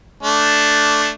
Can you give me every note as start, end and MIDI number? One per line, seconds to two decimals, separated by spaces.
0.23 1.09 57
0.23 1.09 62